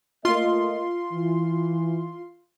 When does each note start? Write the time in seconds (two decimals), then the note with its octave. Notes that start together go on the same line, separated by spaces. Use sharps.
0.25 A3 A#3 F4 D#5 C6
1.12 E3